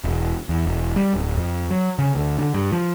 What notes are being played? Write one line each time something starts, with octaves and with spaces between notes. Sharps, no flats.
E1
E2
E1
G3
D1
F2
F#3
C#3
D2
D3
G2
F3